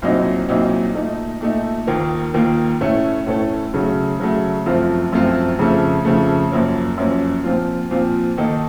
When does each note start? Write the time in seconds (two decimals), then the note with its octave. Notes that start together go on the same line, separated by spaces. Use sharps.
0.02 C2 A#2 F#3 C4 D#4
0.48 C2 A#2 F#3 C4 D#4
0.95 A#2 A3 D#4
1.41 A#2 A3 D#4
1.87 D#2 D#3 A#3 F4 A#4
2.34 D#2 D#3 A#3 F4 A#4
2.81 A2 A3 C#4 A4
3.27 A2 A3 C#4 A4
3.74 C#3 F#3 A3
4.20 C#3 F#3 A3
4.66 F#2 F3 A3 C4 F4
5.12 F#2 F3 A3 C4 F4
5.58 F2 C#3 F3 A3
6.05 F2 C#3 F3 A3
6.52 F#2 F3 A#3 C#4
6.98 F#2 F3 A#3 C#4
7.44 A#2 F3 C4 F4
7.91 A#2 F3 C4 F4
8.37 D#3 A#3 D#4 A4